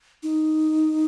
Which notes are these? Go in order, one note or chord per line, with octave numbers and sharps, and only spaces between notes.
D#4